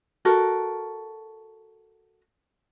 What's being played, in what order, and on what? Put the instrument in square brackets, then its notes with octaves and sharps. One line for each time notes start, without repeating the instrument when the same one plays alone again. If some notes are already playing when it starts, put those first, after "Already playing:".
[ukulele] F#4 A4 A#4